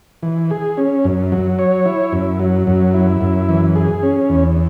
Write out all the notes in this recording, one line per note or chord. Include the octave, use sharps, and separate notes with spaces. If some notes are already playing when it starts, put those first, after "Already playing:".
E3
G#4
C#4
F#2
F#3
C#5
E4
F#2
F#3
F#2
E4
F#2
E3
G#4
C#4
E2